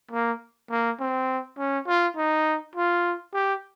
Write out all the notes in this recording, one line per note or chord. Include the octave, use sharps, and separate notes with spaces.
A#3
A#3
C4
C#4
F4
D#4
F4
G4